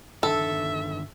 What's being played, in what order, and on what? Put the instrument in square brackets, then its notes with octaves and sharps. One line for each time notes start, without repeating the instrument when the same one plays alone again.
[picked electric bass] G1 D#3 D4 [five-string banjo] A4 [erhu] E5